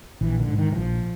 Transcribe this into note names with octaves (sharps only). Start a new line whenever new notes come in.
A#1 E3
D3
G#2
D#3
E3
A#1 F3